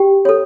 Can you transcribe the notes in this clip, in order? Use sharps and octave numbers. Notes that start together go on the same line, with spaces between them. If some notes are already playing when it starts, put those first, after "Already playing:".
Already playing: G4 G5
A4 C#5